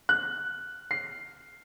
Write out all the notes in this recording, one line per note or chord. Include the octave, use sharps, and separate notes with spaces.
F#6
C7